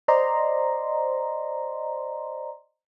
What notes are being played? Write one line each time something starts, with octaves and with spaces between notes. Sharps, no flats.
C5 D5 D#5 A#5 C6